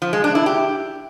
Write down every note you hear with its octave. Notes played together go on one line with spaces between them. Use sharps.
F3
G#3
D4
E4
G4